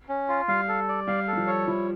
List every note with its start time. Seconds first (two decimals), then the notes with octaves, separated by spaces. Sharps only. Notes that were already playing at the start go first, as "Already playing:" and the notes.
0.09 C#4
0.29 F4
0.48 G3 F5
0.69 A4
0.89 D5
1.07 G3 F5
1.28 A4
1.33 G3
1.37 F3
1.47 C#5
1.67 F3 E4